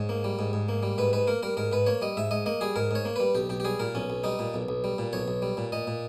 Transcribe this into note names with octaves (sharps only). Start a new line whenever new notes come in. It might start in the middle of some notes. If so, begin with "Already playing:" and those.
Already playing: G#2 C#5
A#3
G3
G#2
G#2
A#3
G3
G#2 B4
G#2 B4
A#3 A#4
G3 A#4
G#2 A#4
G#2 B4
A#3 C#5
G3 D#5
G#2 E5
G#2 D#5
A#3 D#5
G3 G#4
G#2 A#4
G#2 C#5
A#3
G3 B4
B1 G4
B1 G4
G4
G3 G#4
A#2 A#4
B1 C#4
B1
G3 D#4
A#2
B1
B1
G3
A#2
B1 C#5
B1
G3
A#2
A#2 D#5
A#2